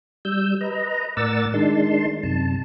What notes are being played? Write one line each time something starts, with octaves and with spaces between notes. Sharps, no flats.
G3 E6 G6
B4 D#5 A#5
A2 A#4 D5 F#5 E6 A6
D#3 G#3 D4 D#4 A5 C6
F#2 C3 A5